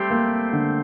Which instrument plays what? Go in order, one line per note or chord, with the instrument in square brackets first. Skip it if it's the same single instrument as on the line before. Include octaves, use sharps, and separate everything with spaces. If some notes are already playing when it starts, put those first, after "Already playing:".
Already playing: [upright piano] G3 [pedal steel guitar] A3 C4 G4 C5
[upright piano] A#3
D3